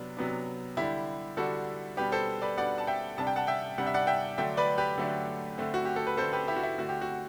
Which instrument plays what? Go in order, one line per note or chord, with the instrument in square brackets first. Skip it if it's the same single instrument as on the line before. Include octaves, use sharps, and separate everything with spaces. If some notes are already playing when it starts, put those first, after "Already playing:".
Already playing: [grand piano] C3 F#3 B3 D4
C3 F#3 B3 D4
D3 G3 D4 E4 G4
D3 G3 D4 F#4 A4
B2 G3 D4 G4 B4
A4 C5
B4 D5
B2 G3 D4 D5 F#5
A5
E5 G5
C3 G3 D4 A5
G5
F#5 A5
E5 G5
C3 G3 D4 F#5
E5
D5 F#5
E5 G5
D3 F#3 A3 D4 E5 G5
B4 D5
G4 B4
D3 F#3 A3 D4
D3 A3 C4
F#4
G4
A4
B4
D3 A3 C4 A4 C5
G4 B4
E4 G4
F#4
E4
D3 A3 C4 F#4
G4
F#4